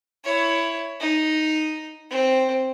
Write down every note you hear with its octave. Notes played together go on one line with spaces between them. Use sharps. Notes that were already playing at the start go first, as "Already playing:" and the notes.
E4 C#5
D#4
C4